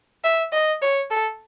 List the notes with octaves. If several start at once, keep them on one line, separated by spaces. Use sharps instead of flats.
E5
D#5
C#5
A4